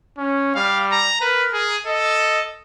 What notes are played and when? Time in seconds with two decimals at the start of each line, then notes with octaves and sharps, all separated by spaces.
0.18 C#4
0.56 G3 F5
0.92 A#5
1.21 A#4 B4
1.53 G#4
1.87 A4 D#5